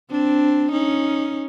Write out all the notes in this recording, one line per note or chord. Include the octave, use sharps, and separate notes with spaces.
C4 D4
C#4 D#4